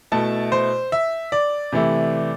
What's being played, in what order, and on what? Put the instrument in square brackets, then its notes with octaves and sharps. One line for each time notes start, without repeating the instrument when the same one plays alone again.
[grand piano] B2 A3 E4 A5
C5
E5
D5
C3 E3 A3 E4